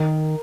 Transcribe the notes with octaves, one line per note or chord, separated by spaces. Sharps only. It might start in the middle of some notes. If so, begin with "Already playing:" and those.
Already playing: D#3 A#4